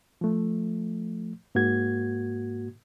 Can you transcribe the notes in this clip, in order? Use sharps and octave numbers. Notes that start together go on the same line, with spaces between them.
F3 A3
G#2 A#3 F#4 G#6